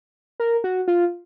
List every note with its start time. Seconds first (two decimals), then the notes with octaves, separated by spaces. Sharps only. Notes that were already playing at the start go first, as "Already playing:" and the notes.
0.40 A#4
0.64 F#4
0.88 F4